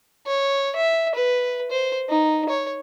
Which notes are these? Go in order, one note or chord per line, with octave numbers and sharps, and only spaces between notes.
C#5
E5
B4
C5
D#4
C#5